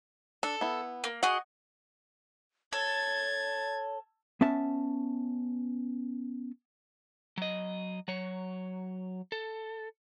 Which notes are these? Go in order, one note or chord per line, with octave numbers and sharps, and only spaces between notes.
D4 A4
B3 E4
A#3
F#4 G#4 D#5 F#5
A4 C#5 G#6 A6
B3 C#4 E5 A5
F#3 D#5
F#3 C#5
A4